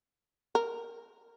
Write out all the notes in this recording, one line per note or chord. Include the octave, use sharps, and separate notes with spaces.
A#4